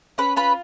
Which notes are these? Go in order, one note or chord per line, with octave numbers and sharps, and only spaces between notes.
C#4 B4 B5
F4 B4 B5